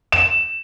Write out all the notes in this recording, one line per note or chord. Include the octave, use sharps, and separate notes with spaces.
E7